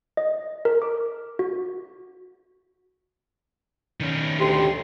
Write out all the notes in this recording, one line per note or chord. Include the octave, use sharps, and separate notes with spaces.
D#5
A#4
D6
F#4
D#3 C#4
D2 C3 G4 C6